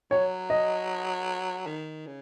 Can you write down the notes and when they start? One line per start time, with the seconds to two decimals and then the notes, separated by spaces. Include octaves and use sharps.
0.11 F#3 C#5
0.50 D#5
1.67 D#3
2.07 C#3